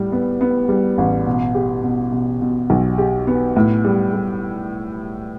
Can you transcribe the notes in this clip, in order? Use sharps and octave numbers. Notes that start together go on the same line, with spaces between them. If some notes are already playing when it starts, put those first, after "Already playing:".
Already playing: A2 G3
B3
B3
G3
A1
B2
G4
B2
B2
B2
B1
G4
B3
A2
G3
G3